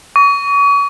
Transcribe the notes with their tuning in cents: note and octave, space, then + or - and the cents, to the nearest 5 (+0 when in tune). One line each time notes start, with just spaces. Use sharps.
C#6 +35